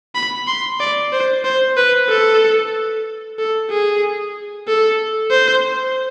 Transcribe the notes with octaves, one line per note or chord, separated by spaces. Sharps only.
B5
C6
D5
C5
C5
B4
A4
A4
G#4
A4
C5